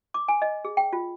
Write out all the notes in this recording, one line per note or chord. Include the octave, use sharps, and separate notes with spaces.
D6
G#5
D#5
G#4
G5
F4